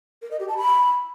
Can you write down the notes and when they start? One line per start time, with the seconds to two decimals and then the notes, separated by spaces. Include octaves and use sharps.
0.22 A#4
0.31 D#5
0.40 G4
0.48 A5
0.57 B5